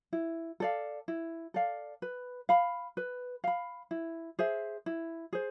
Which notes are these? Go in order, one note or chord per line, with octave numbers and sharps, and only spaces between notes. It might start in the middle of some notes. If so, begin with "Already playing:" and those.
E4
A4 D5 F5
E4
A4 D5 F5
B4
F5 B5
B4
F5 B5
E4
G#4 C5 E5
E4
G#4 C5